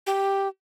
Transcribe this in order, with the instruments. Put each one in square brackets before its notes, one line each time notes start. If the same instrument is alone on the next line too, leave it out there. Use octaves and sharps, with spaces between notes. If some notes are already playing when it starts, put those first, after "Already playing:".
[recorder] G4